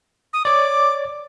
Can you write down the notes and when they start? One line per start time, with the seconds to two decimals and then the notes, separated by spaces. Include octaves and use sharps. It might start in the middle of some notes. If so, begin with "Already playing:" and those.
0.33 D#6
0.45 C#5 D5 D6